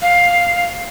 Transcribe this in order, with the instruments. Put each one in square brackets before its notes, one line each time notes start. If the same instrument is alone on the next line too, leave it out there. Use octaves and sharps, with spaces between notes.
[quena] F5